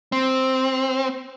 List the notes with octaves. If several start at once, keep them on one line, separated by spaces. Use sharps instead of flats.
C4